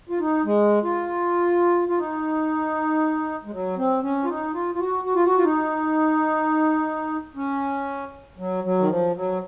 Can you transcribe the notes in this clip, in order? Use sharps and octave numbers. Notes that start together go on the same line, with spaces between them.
F4
D#4
G#3
F4
F4
D#4
G#3
F#3
C4
C#4
F4
D#4
F4
F4
F#4
F#4
F4
F#4
F4
D#4
C#4
F#3
F#3
D#3
F3
F#3